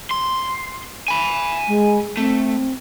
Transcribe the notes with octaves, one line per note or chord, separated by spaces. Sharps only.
C6
G#5 B5
G#3
A3 C4